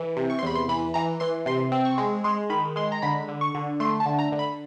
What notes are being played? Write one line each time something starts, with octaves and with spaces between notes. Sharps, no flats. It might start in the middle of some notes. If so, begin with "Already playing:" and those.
Already playing: E3
C3
C#6
C6
E2 B5
C6
E3 B5
E3 A#5
E3 C6
C3 C6
C4
C#6
G#3
G#3 C6
D#3 B5
G#3 C6
A#5
D3 B5
D3
C#6
D3
A3 C6
A5
D3
A#5
D3
B5